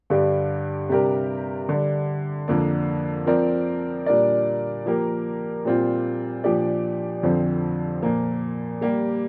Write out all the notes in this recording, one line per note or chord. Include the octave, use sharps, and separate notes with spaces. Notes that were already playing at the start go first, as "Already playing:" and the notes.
G2 D3 G3 D4 G4
C3 G3 D4 G4 A#4
D3 G3 D4
F2 D3 A#3 D4
F3 C4 A#4 D5
A#2 G3 D4 A#4 D5
F3 A#3 G4 A#4
A#2 G3 C4 F4
A#2 F3 D4 G4 D5
F2 D3 F3 C4
A#2 F3 A#3
G3 A#3 G4